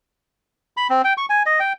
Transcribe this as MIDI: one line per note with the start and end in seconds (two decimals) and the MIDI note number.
0.77 0.87 83
0.90 1.02 60
1.04 1.13 79
1.17 1.26 85
1.30 1.43 80
1.46 1.60 75
1.60 1.73 79